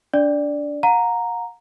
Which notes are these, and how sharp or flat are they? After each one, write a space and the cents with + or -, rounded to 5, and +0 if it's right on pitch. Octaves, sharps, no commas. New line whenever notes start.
D4 -25 D5 +0
F#5 -45 A#5 +0